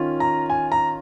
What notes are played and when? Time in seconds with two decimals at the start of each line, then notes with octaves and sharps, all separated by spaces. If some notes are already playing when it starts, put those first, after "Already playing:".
Already playing: D#3 C#4 F4
0.20 A#5
0.50 G#5
0.72 A#5